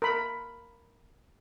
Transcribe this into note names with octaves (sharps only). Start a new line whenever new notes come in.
A#4 B5